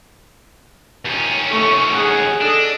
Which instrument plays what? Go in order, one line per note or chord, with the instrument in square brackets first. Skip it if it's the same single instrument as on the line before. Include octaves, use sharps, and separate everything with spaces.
[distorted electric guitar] D#2 C#4
[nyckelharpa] A3 C#6
G#4 F#5
[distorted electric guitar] D4 [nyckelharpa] A4 D#5